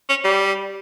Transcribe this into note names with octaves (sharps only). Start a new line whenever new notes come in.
C#4
G3